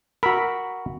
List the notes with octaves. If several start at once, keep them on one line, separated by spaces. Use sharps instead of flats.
F#4 A#4 B5 E6